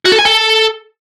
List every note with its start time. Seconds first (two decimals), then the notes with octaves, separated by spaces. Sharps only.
0.05 F#4
0.12 A4
0.19 G#5
0.25 A4